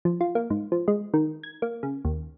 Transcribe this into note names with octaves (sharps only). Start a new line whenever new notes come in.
F3
F4
A#3
G#2
F3
G#3
D#3
G#6
A#3
C#3
D#2